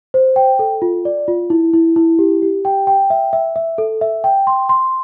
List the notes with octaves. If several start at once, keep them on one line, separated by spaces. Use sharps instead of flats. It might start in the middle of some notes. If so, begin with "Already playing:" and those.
C5
G5
A4
F4
D5
F4
E4
E4
E4
G4
G4
G5
G5
E5
E5
E5
A4
E5
G5
C6
C6